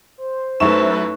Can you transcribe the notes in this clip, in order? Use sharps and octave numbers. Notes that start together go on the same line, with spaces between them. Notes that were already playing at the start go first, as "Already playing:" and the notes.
C5
F#2 A3 D#4 E4 B4 C#6 E7